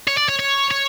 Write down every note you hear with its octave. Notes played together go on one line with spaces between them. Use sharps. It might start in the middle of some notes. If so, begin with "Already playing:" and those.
C#5
D5
C#5
C#5
C#5